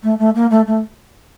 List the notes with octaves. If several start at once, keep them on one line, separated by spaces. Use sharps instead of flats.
A3
A3
A#3
A3
A3